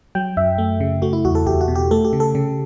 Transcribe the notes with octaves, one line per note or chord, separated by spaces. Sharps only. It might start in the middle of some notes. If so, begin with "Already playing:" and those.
F#3 G5
F#2 E5
A3
C#3
A3 F#4
E4
E2 F#4
A4
E2 G4
F#4
B2
G4
A3 A4
G4
C#3
A4
C#3